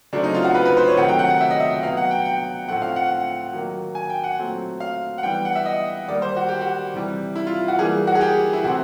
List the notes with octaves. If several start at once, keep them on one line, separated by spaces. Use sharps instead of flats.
C#3 F#3 A3 C4 D4
D#4
F4
F#4
B4
B4
C5
C#5
C3 D#3 F#3 A3 F#5
G5
F#5
F#5
E5
D#5
E5
B2 F#3 B3 F5
F#5
G5
G5
A2 F3 A3 C4 F#5
F5
F#5
D#3 F#3 A#3
G#5
G5
F#5
A#2 F#3 A3 C4
F5
F#5
E3 G3 B3 G5
G5
F#5
E5
D#5
D#3 G3 A#3 D5
C5
F#4
G4
F#4
C3 E3 G3
E4
F4
F#4
E3 G3 A#3 G#4
F#4
G#4
G4
E4
C3 E3 A3 C4 F#4